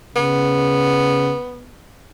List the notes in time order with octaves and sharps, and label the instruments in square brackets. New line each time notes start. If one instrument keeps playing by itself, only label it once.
[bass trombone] C#3 [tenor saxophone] B3